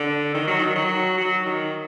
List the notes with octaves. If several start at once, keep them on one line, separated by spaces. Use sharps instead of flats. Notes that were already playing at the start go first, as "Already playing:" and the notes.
Already playing: D3
D#3
F#3
D#3
F#3
F#3
D#3